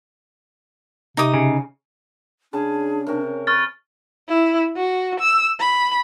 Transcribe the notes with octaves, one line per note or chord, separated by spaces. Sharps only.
C3 D#4 D6 D#6
C#3
C#3 D4 G#4 A5
C3 C#4 A#4
B4 C#6 F6 A6
E4
F#4
E6
B5